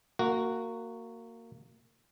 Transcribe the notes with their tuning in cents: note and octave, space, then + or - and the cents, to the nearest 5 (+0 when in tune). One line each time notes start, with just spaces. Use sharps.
A#3 -20 F#4 +0